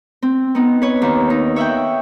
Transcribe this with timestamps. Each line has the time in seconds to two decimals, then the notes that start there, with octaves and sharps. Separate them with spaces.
0.23 C4
0.55 B3 D#4
0.82 B4 C#5
1.02 D#2
1.30 D#4
1.56 C#5 E5 F#5 G5